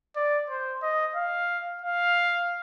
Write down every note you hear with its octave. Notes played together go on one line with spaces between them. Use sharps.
D5
C5
D#5
F5
F5